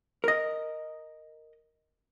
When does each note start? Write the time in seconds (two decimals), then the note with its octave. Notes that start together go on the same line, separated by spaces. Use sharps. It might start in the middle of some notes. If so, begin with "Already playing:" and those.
0.24 A#4 D#5